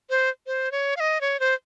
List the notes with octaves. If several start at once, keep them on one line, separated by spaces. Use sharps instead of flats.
C5
C5
C#5
F5
D#5
C#5
C5